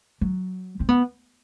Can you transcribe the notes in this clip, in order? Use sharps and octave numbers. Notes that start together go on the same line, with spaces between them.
F#3
C4
B3